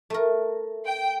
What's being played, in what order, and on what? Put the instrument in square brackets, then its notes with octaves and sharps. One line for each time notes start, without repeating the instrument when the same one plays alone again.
[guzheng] A3 A#4
[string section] G5